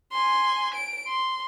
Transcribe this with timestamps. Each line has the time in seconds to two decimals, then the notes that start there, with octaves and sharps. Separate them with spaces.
0.13 G#5 C6
0.74 D7
1.08 C6